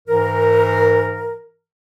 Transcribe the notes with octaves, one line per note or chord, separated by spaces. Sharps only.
G#2 E3 A#4